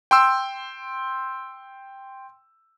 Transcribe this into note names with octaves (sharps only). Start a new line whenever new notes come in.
G5 C6 E6